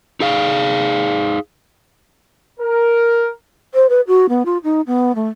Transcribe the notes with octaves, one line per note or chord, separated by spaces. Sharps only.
D#4 G#4 F5
A#4
C5
B4
F#4
B3
F4
D#4
B3
A3